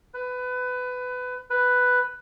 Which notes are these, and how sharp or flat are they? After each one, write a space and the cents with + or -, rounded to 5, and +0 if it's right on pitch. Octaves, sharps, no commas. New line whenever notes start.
B4 +20
B4 +5